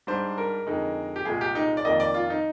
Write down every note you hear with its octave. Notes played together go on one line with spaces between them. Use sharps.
G#2 G3 D4 C5
A#4
F2 D3 G#3 D#4
G4
C2 A#2 G#3 G#4
G4
D#4
D5
F2 D#3 A#3 D#5
D5
F4
D#4